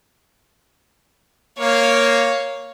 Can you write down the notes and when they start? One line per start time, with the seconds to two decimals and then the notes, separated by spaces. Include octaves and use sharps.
1.59 A#3 C#5 F5